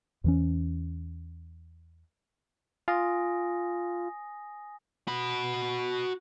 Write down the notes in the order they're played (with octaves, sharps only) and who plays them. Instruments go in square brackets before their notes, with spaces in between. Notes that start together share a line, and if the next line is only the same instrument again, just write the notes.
[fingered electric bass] E2 E3 C#4
[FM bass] F4 [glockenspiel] G#5 D#6 A#6
[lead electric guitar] F#4 B5